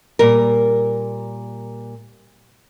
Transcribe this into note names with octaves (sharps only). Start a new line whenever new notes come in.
A#2 G3 A#4